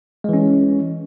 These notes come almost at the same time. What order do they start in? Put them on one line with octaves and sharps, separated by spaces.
G#3 E3 C#4